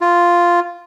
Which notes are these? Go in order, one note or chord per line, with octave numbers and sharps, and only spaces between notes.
F4